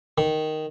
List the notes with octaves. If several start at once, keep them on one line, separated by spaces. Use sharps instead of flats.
D#3